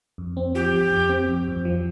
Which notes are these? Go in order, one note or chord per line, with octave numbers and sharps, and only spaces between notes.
F2
C4
F3 G4
F2
F2
C4
F2
F2
F3